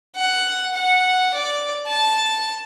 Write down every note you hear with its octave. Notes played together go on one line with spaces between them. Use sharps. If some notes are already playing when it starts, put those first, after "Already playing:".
F#5
F#5
D5
A5